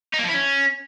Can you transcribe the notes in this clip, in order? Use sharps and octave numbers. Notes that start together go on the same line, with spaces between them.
D#4
A#3
F3
E4
C#4